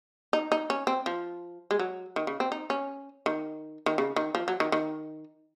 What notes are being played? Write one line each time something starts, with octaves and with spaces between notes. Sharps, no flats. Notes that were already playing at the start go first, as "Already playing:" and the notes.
D#4
D#4
C#4
C4
F3
G#3
F#3
D#3
C#3
C4
D#4
C#4
D#3
D#3
C#3
D#3
F3
F#3
D#3
D#3